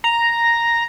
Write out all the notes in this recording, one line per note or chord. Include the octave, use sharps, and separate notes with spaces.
A#5